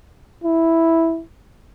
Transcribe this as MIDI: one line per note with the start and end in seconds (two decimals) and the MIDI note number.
0.44 1.21 64